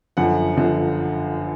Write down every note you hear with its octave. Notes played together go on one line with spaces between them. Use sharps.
G1 F#2 D3 F3 F#5
G1 F#2 D3 F3